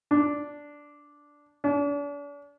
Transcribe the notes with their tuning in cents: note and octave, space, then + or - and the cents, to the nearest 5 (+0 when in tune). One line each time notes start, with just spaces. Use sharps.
D4 -5
D4 -40